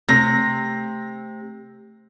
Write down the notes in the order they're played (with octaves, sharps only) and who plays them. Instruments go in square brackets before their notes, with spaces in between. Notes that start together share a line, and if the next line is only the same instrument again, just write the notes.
[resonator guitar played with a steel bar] C3 [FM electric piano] A3 [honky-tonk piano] A#6